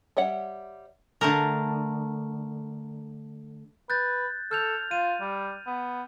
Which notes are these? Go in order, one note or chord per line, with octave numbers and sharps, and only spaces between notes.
G3 C#5 E5 F#5
D3 A3 A#4
B4 F#6 G6 A6
A4 F6 G6 F7
F4 D#7
G3
B3